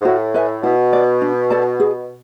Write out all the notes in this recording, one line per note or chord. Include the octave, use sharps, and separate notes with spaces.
G#2
A2 F#4
B4 E5 G#5
B2 E4
B4 D5
D4
A4 D5 A5
G#4